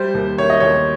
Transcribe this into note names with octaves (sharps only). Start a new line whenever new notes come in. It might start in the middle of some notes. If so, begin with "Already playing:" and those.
Already playing: G3 C5
D#2
D#3 C#5
D#5
D#2 C#5